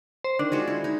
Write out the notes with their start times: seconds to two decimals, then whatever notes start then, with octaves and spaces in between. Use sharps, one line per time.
0.24 C5
0.39 D#3 D4
0.52 G#3 F4 F#4
0.68 E4
0.84 D#4